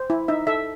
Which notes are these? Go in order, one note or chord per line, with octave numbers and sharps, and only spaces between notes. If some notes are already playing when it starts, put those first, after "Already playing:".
Already playing: C5
E4
D#4 E5
A4 E5